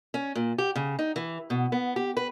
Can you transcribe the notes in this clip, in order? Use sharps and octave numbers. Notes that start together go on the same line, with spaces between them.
C#4
A#2
G4
C#3
D#4
E3
B2
B3
G4
B4